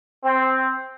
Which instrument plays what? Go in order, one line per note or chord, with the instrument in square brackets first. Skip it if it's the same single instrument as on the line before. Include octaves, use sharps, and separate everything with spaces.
[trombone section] C4